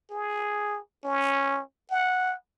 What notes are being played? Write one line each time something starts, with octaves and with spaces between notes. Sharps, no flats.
G#4
C#4
F#5